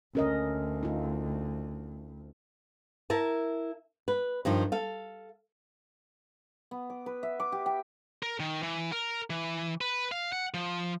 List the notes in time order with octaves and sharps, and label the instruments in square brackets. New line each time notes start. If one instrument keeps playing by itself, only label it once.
[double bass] D2 [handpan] C#4 A#4 D#5
[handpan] D#4 F4
[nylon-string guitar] E4 A#4 A5
B4
G2 D#3 F3
A4 F5
[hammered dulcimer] B3
D6
B4
E5
D6
G4
G5
[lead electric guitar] A#4
D#3
E3
A#4
E3
B4
F5
F#5
F3